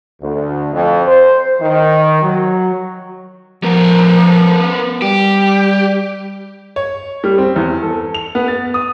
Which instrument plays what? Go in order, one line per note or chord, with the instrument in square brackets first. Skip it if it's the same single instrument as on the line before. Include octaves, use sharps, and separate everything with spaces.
[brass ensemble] D2
F2
C5
D#3
F#3
[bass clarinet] F3 [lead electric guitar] B3 A#4
[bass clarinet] G3 [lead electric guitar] G4
[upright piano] C#5
G3
C4
E2
A4
F7
B3
A6
D#6